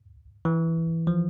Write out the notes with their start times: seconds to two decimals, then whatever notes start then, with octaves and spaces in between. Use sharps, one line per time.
0.45 E3
1.07 F3